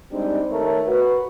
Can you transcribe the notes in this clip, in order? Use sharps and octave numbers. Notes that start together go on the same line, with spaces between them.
G3 G#3 C4 D4 D#4
D#3 A3 A#4 C#5
F#4 B4